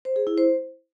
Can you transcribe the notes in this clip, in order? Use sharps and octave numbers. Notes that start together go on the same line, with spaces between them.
C5
G#4
E4
C5